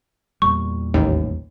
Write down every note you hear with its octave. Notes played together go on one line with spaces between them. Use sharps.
E2 A#2 G3 C#6
A1 D#2